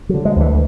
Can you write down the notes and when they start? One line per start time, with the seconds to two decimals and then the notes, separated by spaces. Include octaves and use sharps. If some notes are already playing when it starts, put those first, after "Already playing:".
0.09 F#3
0.14 D3
0.25 G#3
0.36 D2 E3